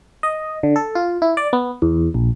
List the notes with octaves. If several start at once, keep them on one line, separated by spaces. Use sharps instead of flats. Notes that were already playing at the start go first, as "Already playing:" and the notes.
D#5
D3
A4
F4
E4
D5
B3
E2
A#1